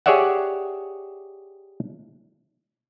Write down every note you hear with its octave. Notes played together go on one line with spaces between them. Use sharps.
G4 G#4 C#5 D5 E5 F#5